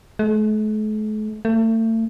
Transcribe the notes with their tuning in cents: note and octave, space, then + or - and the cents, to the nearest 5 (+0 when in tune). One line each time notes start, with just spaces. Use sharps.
A3 -45
A3 +35